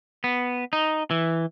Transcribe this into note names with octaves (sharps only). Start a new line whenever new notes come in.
B3
D#4
E3